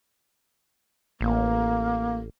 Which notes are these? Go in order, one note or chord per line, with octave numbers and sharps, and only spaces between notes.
A1 A#3